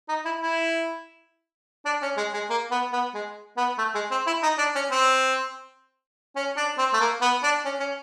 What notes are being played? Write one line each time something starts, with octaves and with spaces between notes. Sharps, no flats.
D#4
E4
E4
D4
C#4
G#3
G#3
A#3
B3
B3
G#3
B3
A3
G#3
C4
E4
D#4
D4
C#4
C4
C#4
D4
C4
A3
A#3
B3
D4
C#4
C#4